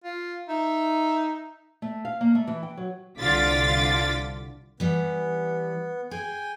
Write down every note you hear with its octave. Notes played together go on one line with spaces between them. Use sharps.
F4
D#4 E5
A3
F5
A#3
A3
E3
G5
F#3
C2 D3 F4 D6 A6 B6
E3 G3 B3
G#4 G5 G#5